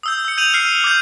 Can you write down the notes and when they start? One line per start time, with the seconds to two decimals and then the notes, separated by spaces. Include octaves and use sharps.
0.03 D#6 E6 G6
0.25 E6 C#7
0.38 G6 D#7 F7 F#7
0.54 F6 C7 C#7
0.84 D6 G6